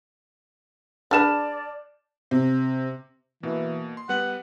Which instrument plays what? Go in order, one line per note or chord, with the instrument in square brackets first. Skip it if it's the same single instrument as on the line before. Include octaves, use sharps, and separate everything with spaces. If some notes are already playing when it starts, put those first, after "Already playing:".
[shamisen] D4 G#4 B4 [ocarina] D5 [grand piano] A5 F6 E7
[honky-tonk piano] C3
[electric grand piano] B2 A#3 [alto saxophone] E3
[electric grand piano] C6
[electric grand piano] G3 B3 B4 [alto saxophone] F#5